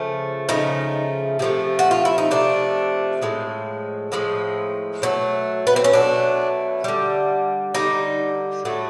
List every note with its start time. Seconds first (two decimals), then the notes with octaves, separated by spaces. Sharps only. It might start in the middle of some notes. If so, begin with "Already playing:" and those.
Already playing: C#3 F3 A3
0.49 C#3 F3 A3 D#4
1.39 C3 F3 A3
1.79 F#4
1.91 F4
2.05 E4
2.18 D#4
2.31 C3 F3 A3 D4
3.22 A2 F3 G#3
4.12 A2 F3 G#3
5.02 B2 F#3 A3 C#4
5.67 B3
5.76 C4
5.84 C#4
5.93 B2 F#3 A3 D4
6.84 D3 G3
7.74 D3 G3 D#4
8.65 A2 F#3 A3